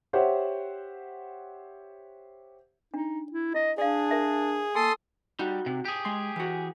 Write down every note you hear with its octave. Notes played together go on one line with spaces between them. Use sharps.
G4 C5 C#5 E5 F#5
D4 D#4
E4
E4 D#5
D4 G#4 D5 F5
A#4 E5 A5
A#3 A4 G#5 C6 D#6
G3 D#4 F#4
C3
G4 G#4
G#3 C6
E3 F#4